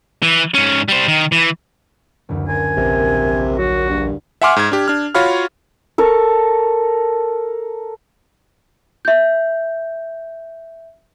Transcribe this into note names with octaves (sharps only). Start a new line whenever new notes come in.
E3
G#2 C#4
G3 C5
D#3
E3
F#1 D2
A#4 C5 G#5
A#1 C3 A#4
F#3 F#4
G2
E5 F#5 G#5 C6 D6 F6
G#2 G#6
D4 G4
D4 F6
F4 F#4 C#5 F5 B5 F6
A4 A#4 C#6
E5 G6